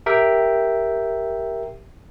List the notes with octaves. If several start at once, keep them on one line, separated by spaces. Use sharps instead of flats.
G4 A#4 E5 G5